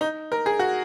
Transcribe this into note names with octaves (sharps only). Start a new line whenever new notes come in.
D#4
A#4
G#4
F#4